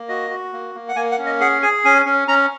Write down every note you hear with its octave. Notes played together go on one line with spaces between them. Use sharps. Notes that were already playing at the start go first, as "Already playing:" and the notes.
Already playing: A#3
F#4 D#5
F#4
A#3
A#3
F#5
A#3 G#5
F#5
C#4
D#5
G#4 F#5
G#4 G#5
C#4 G#5
C#4
C#4 A#5